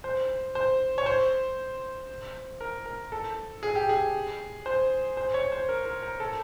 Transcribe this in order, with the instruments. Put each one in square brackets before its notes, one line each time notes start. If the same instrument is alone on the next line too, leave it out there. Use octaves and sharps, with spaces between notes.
[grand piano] C5
C5
C#5
C5
A#4
A#4
A4
G#4
G4
G#4
C5
C5
C#5
C5
A#4
A#4
A#4
A4